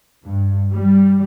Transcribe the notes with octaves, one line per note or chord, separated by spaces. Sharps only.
G2
G3